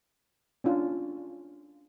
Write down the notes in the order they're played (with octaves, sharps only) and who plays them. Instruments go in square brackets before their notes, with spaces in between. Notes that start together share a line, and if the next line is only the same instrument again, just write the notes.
[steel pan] C#4 D4 F4